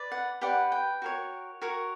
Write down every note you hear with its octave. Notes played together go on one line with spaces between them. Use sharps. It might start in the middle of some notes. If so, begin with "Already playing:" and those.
Already playing: B4 D5
F#5
G4 B4 D5 F#5
G5
F#4 A#4 C#5
F#4 A#4 C#5